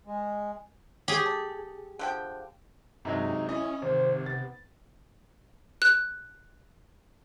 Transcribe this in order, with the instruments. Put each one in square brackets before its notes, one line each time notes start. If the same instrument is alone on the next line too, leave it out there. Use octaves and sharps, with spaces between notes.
[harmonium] G#3
[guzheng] G4 G#4 [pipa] C#5
[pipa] A4
D3 F3 G5
[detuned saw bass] G2 [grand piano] C3 F#3 G#3 [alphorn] D#4
[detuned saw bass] C#4 [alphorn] E4 [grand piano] D#5
[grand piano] G#1 [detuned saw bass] C3 [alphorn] C5
[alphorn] B3 [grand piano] A6
[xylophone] F#6